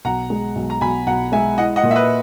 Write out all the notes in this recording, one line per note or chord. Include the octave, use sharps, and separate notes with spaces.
B1 F#5 A#5
G#3
B1
A#5
B1 G#5 B5
B1 F#5 A#5
G#3 E5 G#5
E4 D#5 F#5
D#5 F#5
A#2
E5
B4 D#5